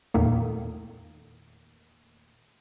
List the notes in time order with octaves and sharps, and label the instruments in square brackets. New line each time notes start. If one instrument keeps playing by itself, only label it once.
[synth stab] E2 A#2 D#3 A3 A#3